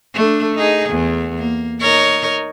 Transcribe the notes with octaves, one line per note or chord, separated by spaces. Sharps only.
A3 D4
D#4 G#4
E2
A#3
D#4 A#4 C#5